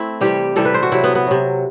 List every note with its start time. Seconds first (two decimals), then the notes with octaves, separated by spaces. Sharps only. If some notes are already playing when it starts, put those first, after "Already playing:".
Already playing: A3 C4 E4
0.21 C3 E3 G3 G4
0.56 C3 E3 G3 A4
0.65 B4
0.74 C5
0.83 F#4
0.92 C3 F#3 E4
1.04 B3
1.15 B3
1.27 C3 F#3